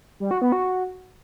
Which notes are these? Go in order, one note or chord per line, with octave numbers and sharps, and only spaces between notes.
G3
F#4
B3
F#4